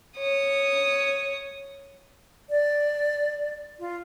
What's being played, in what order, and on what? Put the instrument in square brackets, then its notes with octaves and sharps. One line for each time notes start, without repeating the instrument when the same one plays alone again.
[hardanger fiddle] C#5 D#6
[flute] D5
F4